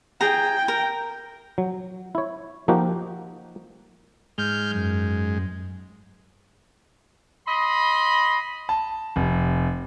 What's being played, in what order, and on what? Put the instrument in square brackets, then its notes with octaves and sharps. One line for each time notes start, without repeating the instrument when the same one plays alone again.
[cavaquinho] G#4 A#5 [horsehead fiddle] G5
[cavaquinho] A#4
[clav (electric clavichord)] F#3
E4 C#5
F3 A#3 D#4 F#4 G4
[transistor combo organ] G#2 G#3 [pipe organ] F6 G6
[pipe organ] F#2
[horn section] D#5 B5 C6
[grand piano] A5
F1